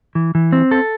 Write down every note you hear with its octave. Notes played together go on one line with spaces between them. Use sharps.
E3
E3
C4
A4